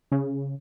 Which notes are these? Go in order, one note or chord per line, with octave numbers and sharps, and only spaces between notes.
C#3